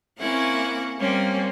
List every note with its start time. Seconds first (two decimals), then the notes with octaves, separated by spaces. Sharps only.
0.19 A#3 C4 C#4 E4 F#5
0.98 G3 A#3 C4 C#4